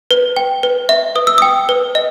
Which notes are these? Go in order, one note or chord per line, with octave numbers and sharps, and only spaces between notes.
B4
G5
B4
E5
B4 D#6
E6
G5 D#6
B4
D#5